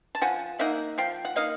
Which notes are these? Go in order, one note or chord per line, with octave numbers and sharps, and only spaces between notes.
A5
F3 F#5 G#5
A#3 D#4 E5 F#5
F3 F5 G5
F#5
A#3 D#4 D#5 F5